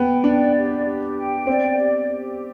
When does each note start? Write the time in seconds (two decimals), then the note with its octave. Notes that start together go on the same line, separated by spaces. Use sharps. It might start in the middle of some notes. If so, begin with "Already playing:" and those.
Already playing: B3 G5
0.23 D4 D5
0.54 G4
0.85 G4
1.16 G5
1.47 C4 D5
1.78 G4
2.09 G4